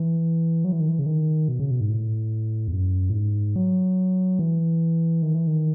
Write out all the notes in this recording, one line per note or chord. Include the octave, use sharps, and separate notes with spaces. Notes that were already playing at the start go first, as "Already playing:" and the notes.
Already playing: E3
F#3
E3
D#3
E3
C#3
D#3
B2
C#3
B2
G#2
A2
E2
F#2
A2
G#2
F#3
E3
D#3
E3
D#3